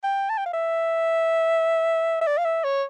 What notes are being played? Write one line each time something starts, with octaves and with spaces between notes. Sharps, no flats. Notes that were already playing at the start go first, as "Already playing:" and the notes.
G5
A5
G5
F5
E5
E5
D5
F5
E5
C#5